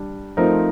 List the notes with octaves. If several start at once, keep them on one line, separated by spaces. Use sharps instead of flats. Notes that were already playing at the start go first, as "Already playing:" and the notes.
Already playing: G3 D4
F3 A3 C4 D#4 A#4